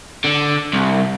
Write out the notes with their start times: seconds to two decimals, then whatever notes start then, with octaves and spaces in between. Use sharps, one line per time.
0.24 D3
0.73 C2